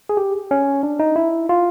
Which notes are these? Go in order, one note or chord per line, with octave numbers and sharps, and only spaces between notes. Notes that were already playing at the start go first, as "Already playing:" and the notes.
G#4
G4
C#4
D4
D#4
E4
F4